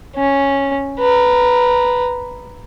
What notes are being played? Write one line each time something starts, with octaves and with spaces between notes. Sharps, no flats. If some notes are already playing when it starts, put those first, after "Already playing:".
C#4
B4 A#5